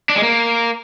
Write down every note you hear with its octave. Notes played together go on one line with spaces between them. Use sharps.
D4
G#3
A#3